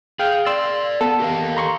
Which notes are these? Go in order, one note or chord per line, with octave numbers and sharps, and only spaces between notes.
G#4 F5 G5 F6
A#4 D5 C6 E6
B3 A4
G4 A#4 F5
A#5 C6 C#6